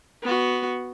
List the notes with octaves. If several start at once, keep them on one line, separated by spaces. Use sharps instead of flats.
B3 F#4